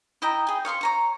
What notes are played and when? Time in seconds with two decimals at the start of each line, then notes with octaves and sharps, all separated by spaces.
0.22 E4 D#5 G5 A#5
0.47 G#4 G5
0.65 C#5 F5 C6 C#6
0.81 C#5 A#5 C#6